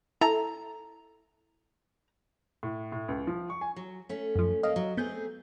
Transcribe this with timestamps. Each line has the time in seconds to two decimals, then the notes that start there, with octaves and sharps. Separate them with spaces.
0.21 E4 A4 A#5
2.63 A2
2.92 A2
3.09 C#2
3.27 F3
3.50 C#6
3.61 G#5
3.76 F#3
4.09 A3 C#4
4.36 F#2 F3
4.63 A#3 C#4 D#5 F5
4.76 F#3
4.97 A3 B3 C4 G#4 G6